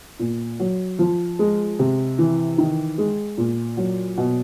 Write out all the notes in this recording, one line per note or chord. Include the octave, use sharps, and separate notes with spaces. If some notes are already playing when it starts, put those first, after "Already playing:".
A#2
F#3
F3
G#3
C3
E3
D#3
G#3
A#2
F#3
B2